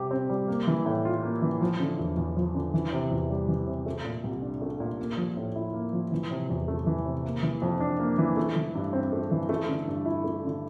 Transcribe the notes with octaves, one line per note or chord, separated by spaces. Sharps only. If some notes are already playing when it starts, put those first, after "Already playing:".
Already playing: C3 G3 G4
C4
G3
A#3
E3
A2
F4
A#3
E3
F3
D3
E2
E2
F3
D3
E3
C3
E2
G3
E3
C3
A3
A#2
C2
D4
A3
A#2
A#3
F3
A2
E4
A#3
F3
E3
C3
E2
A3
E3
C3
A#3
E3
F2
D4
A#3
E3
A3
E3
G2
C4
A3
E3
A3
D3
G2
E4
A3
D3